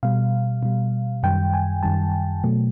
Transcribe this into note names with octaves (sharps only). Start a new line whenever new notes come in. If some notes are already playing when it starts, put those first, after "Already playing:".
B2 G3 F5
B2 G3
F#2 D#3 G3 G5
G#5
F#2 D#3 G3 A5
B2 F#3 A3